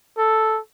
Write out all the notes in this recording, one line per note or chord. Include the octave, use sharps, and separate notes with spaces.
A4